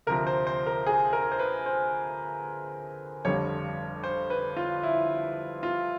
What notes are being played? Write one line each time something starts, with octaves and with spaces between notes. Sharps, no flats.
D2 C3 F3 A#4
C5
C5
A#4
G#4
A#4
C5
B4
C5
G1 F2 D3 G3 C#5
C5
B4
F4
E4
F4